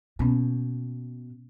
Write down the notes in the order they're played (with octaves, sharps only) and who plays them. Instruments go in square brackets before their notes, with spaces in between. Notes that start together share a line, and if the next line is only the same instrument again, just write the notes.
[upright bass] B2 [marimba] A#3 B3 C#4